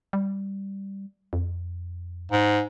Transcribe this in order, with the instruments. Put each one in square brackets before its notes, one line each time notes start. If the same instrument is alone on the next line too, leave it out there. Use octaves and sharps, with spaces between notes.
[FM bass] G3
F2
[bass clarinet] G#2